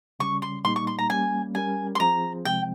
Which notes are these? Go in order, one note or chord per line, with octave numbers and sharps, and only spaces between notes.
C#3 G3 C#4 C#6
C6
A#2 G3 A#3 D#4 C6
C#6
C6
A#5
G3 A#3 C#4 G#5
G3 C#4 G4 A#4 G#5
C6
F3 C4 F4 G#4 C5 A#5
C3 F3 G#3 C4 G5